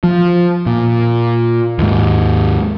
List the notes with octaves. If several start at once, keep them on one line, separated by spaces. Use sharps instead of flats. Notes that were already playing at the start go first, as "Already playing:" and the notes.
F3
A#2
D#2 G#2